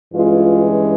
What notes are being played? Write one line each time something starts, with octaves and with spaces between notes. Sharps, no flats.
G2 E3 G#3 C#4 F4